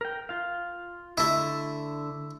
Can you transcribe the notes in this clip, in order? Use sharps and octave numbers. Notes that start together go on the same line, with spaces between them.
A#4 G5
F4 F5
D3 A3 E4 E6